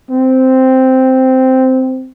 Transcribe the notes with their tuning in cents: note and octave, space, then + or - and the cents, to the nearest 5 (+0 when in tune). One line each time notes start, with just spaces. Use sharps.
C4 -5